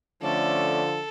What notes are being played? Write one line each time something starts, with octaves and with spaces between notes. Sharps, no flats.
D3 F3 A3 C#4 A4 D5